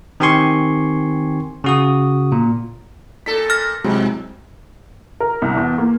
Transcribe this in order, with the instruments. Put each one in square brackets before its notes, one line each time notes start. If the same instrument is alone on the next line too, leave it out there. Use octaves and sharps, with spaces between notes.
[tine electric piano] D#3 C4 G4 G#5 C6 C#6
C#3 F#4 D#6
A#2
[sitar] A#2 A4 [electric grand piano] B6
[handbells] F6 A#6
[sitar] G#2 [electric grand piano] C3 F#3 G#3
[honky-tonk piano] A#4
C2
E2
A#3